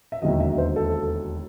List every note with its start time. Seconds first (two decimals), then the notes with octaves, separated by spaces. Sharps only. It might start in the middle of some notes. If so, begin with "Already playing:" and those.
0.12 E5
0.22 E1 D#2 D3 F#3 D#5
0.40 E5
0.58 C5
0.76 A4